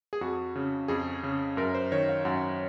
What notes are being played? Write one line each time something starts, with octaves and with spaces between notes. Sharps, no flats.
G#4
F2 F#4
C#3
F2 G#4
C#3
F#2 A#4
C5
D#3 C#5
F5
F#2 F#5